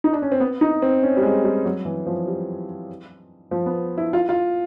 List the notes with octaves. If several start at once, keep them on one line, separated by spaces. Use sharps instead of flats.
D#4
D4
C#4
C4
B3
D#4
C4
C#4
G3
G#3
G3
F#3
E3
F3
G3
F3
B3
E4
F4
F4